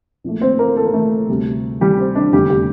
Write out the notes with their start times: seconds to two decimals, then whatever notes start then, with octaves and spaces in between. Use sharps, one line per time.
0.24 A#1 A#2 A3
0.41 C4 C5
0.59 A#3 A#4
0.77 A4
0.85 A#4
0.94 A3 A4
1.29 D2 C3 G3
1.81 G3 G4
1.99 C4
2.15 D4
2.33 F1 E2 D3 G3 A3 G4
2.50 G4